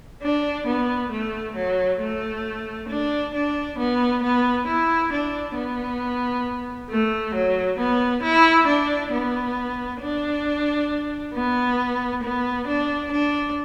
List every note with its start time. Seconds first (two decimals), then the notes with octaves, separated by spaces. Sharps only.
0.22 D4
0.66 B3
1.11 A3
1.56 F#3
2.00 A3
2.89 D4
3.34 D4
3.78 B3
4.23 B3
4.67 E4
5.12 D4
5.55 B3
6.90 A3
7.34 F#3
7.79 B3
8.23 E4
8.67 D4
9.12 B3
10.01 D4
11.33 B3
12.23 B3
12.67 D4
13.12 D4